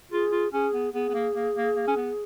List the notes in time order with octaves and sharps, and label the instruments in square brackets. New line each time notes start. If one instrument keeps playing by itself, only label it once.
[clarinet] F4 [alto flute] G#4
[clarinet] F4
[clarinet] C#4 [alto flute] G#4
[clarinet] B3
[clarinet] B3 [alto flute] G#4
[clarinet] B3
A#3
A#3
A#3
A#3
C#4
B3